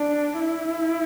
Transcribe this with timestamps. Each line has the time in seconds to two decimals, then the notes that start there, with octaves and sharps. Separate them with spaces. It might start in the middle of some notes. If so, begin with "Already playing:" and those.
Already playing: D4
0.40 E4